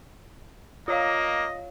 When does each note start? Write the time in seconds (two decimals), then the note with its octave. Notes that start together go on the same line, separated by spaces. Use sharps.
0.88 A#3 F4 C#5 D#5 F5